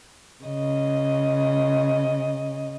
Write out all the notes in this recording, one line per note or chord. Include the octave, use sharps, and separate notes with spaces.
C#3 D#5